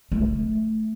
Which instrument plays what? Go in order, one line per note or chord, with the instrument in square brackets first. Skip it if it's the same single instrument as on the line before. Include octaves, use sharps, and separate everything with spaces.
[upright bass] A3